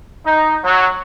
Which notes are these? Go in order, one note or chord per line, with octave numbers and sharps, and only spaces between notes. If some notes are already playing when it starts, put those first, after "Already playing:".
D#4
F#3